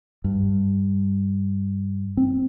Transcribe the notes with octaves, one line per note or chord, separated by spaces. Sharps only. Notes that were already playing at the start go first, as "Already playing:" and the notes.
G2
C4